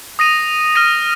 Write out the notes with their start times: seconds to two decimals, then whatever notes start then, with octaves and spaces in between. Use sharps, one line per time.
0.19 D#6 A#6 D#7
0.76 F6 A#6 D#7